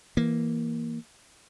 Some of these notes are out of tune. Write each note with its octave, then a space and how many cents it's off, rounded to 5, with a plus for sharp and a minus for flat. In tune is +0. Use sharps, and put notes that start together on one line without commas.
E3 +0 A#3 +0